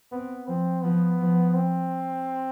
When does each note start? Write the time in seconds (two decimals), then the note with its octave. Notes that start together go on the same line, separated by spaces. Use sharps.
0.12 B3 C4
0.47 F3 C4
0.83 F3 B3
1.19 F3
1.55 C4